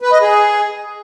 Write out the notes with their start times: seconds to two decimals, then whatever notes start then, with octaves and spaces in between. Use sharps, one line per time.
0.02 B4
0.11 D#5
0.21 G#4